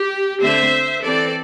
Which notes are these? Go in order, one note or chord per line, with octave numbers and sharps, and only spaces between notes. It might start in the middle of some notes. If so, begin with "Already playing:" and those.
Already playing: G4
D3 A3 C4 C5 E5
E3 C4 A4 D5